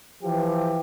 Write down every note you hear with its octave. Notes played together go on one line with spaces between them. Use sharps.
E3 F3 G4